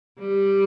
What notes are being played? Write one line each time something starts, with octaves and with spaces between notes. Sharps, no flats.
G3